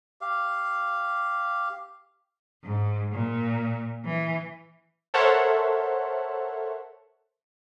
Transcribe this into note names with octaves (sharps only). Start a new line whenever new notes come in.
G4 F5
G#2
A#2
E3
A4 A#4 C5 C#5 E5 F#5